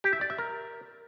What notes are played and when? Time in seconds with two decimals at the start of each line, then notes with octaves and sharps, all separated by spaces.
0.04 G4
0.13 E5
0.21 D5
0.30 E5
0.38 A#4